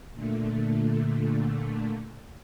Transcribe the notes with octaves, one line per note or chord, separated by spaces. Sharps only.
A#2 D3 A3